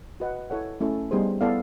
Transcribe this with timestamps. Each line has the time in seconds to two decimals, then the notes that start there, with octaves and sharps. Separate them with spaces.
0.20 F#4 B4 D#5 F#5
0.50 E4 A4 C#5 F#5
0.80 A3 C#4 E4 A4
1.11 G3 B3 D#4 G#4 C5
1.41 B3 E4 A4 D5 F5